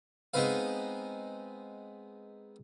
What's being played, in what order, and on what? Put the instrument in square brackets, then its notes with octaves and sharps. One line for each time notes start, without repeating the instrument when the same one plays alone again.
[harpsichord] G#3 B3 C4 D#4 B4 F5